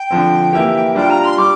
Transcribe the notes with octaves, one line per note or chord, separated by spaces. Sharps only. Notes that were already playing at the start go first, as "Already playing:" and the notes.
Already playing: G5
D3 F3 C4
E3 A#3 E4 G4
G3 D4 F4 G5
A#5
C6
G3 D4 D6